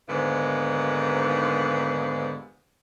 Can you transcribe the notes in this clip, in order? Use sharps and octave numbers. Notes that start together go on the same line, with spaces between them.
D#2 G#2 D3 F3 B3